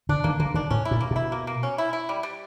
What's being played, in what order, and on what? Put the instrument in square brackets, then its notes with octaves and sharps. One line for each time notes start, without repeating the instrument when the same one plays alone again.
[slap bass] D3 [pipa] D4
[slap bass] D#3 [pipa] A#3
[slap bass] D3 [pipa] A#3
[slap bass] D#3 [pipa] D4
[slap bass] A2 [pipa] C#4
[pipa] E4
[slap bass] A#2
[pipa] A#3
[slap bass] B2 [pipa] E4
[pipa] A#3
A#3
C#4
E4
E4
G3
G3